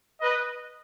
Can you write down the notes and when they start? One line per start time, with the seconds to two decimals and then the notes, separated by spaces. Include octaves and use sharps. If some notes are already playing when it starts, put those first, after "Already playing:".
0.21 B4 D#5